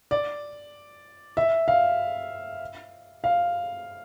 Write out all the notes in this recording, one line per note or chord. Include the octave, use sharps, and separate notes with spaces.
D5
E5
F5
F5